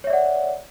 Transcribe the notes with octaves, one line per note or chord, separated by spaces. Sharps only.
C#5 D5 E5 F#5